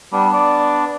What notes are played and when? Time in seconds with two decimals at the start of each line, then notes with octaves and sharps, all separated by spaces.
0.12 G3 B3 D4
0.34 D5